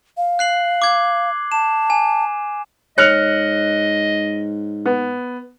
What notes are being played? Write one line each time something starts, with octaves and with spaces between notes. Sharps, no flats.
F5
F#6 C7 F#7
D6 G#6
A5 E7
G#5
G#2 C#5 D#5 F6 F#6 C#7 F7
B3